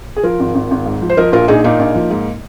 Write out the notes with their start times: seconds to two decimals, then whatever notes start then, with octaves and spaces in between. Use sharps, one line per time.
0.16 G#4
0.23 F3 F4 A#4
0.40 G#1
0.55 G#1
0.71 G#1
0.86 G#2
1.02 F3
1.10 C5
1.17 F3 A#4 D#5
1.32 A#1 F4 A#4
1.48 A#1 D#4 G#4
1.64 A#2 A#3 D#4
1.79 A#1
1.95 F3
2.10 G#2